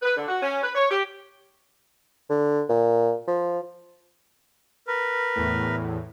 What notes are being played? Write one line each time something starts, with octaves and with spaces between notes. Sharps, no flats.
B4
D3
F#4
C#4
B4
C#5
G4
D3
A#2
F3
A#4 B4
E2 A2